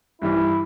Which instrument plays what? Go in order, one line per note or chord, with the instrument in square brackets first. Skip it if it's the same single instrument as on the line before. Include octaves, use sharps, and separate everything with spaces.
[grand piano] G2 E3 G3 [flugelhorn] E4